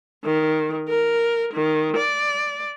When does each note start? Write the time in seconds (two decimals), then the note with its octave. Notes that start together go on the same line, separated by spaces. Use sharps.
0.25 D#3
0.89 A#4
1.54 D#3
1.97 D5